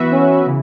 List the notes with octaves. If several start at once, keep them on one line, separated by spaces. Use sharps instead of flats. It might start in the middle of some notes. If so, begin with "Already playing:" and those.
Already playing: E3 B3 F#4 B4 E5
C#4
C#3 E3